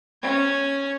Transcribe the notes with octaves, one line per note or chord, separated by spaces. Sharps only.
C#4 G#6